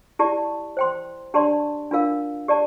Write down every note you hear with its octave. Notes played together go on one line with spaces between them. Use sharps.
E4 G4 D5 A5
C5 G5 C6
D4 G4 D5 A5 C6
D4 F4 A#4 F5
G4 D5 A5